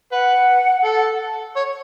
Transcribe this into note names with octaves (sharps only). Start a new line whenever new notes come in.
B4 F#5
A4
C#5